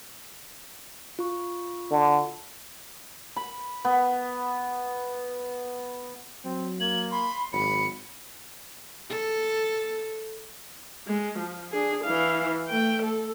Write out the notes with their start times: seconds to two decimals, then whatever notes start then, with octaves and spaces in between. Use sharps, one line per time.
1.19 F4 C#6
1.91 D3
3.36 B5
3.85 B3
6.45 F#3 C4
6.80 A#3 G#6 F#7
7.11 B5 C6
7.52 G#1 F#3 B5 C#7
9.09 A4
11.07 G#3
11.38 F3
11.71 D4 G#4
12.04 E3 F5
12.68 A3 G5
13.02 A4